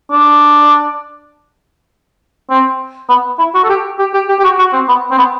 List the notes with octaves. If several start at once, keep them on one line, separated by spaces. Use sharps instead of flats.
D4
C4
B3
E4
F#4
A4
G4
G4
G4
G4
G4
F#4
F#4
C4
B3
C4
B3